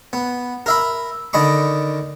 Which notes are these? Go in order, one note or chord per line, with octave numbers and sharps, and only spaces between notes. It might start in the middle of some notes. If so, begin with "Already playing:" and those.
B3
A#4 E5 B5
D3 D#3 D#5 B5 C#6